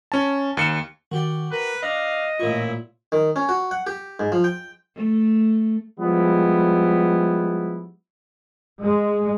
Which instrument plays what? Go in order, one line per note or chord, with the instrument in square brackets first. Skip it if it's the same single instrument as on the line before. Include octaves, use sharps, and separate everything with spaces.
[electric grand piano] C#4 A5
D#2 C#7 E7
[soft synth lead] D#3 [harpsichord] F#4 G4 D5
[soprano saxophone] A#4 [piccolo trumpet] B4 [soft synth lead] F#6
[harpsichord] D4 [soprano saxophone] D#5 [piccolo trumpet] F5
[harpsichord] A1 A#2 C#6 [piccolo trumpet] E4 [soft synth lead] F4
[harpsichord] D#3
C#4
F#4
F#5
G4
G#2
F3
G5
[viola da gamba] A3
[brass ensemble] F3 G3 G#3 B3 E4
[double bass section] G#3